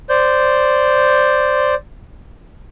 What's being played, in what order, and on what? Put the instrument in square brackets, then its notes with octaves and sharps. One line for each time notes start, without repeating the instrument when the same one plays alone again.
[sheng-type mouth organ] C5 D5 G6